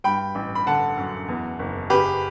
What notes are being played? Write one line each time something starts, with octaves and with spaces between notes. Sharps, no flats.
G2 G5 B5
A1
B5
D3 F#5 A5
F#2
E2
F#1
C#3 G4 B4